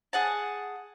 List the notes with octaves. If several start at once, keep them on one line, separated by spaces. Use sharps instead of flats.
G#4 F#5 A5